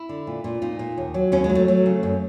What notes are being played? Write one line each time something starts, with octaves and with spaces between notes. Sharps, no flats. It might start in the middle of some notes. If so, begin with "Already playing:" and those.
Already playing: E4
D3
A#2
A#2
A#2 D#4
A#2
D#2
F#3
D#2 C#4
G#3
F#3
A3
F#3
C#3
F#2